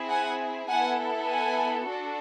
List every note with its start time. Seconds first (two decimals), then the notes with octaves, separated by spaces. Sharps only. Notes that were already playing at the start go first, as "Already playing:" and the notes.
Already playing: C4 E4 G#4
0.09 F#5 G#5
0.68 B3 E4 A4 F#5 G#5
1.27 F#5 G#5
1.87 D4 F#4 A4